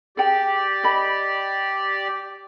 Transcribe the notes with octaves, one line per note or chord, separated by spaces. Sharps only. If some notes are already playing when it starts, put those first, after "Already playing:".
G4 G#4 D5 G5
D#5 B5